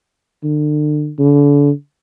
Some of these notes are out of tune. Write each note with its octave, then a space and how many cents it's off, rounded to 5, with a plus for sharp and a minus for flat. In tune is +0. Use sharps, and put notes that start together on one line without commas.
D3 +35
D3 -35